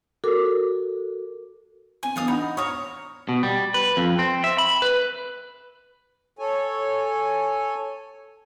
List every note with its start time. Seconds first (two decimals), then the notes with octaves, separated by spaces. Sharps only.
0.24 F#4 A4 A#4 D6
2.03 C4 G#5
2.16 E3 B3 D4 A4 F5 D#6
2.28 D#4 F#5 A#5 B5
2.57 C#5 A#5 D#6 F6
3.29 B2
3.43 G3
3.74 B4
3.97 F2
4.19 C4
4.44 E5
4.58 B5
4.82 B4
6.39 A4 C#5 G#5